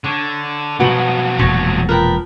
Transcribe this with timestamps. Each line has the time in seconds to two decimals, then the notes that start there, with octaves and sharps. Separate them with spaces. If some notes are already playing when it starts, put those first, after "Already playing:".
0.04 D3 C#5
0.80 B2 F3 F#3 F#4 B4 F#7
1.39 E1 A#2 G#5 C#6
1.89 F3 A#4 B4 G5